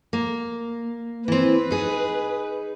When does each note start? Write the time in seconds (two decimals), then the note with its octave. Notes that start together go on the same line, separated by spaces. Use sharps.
0.13 A#3
1.28 E3 C4 B4
1.71 D#4 G#4